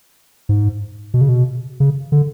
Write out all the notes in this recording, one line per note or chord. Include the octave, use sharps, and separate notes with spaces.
G#2
B2
C#3
B2
C#3
D3